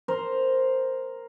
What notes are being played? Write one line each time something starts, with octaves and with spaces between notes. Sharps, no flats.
A#4 C5